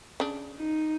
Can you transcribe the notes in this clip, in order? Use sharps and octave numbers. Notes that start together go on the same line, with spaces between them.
C#3 D4
D#4